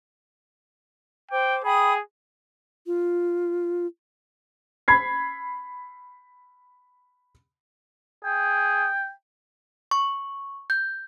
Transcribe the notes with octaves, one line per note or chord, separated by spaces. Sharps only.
C5 G5 D6
G#4 G5 B5 D#6
F4
B5 G#6 C7
G#4 G5
C#6
G6